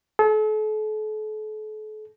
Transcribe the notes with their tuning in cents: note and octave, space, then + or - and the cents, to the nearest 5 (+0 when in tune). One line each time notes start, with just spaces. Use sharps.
A4 -40